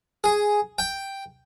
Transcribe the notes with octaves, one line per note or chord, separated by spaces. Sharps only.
G#4
G5